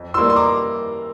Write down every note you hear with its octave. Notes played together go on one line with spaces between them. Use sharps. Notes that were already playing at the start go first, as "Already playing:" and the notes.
Already playing: F2
E3 G3 A#3 C6 E6
C6
A#5 D6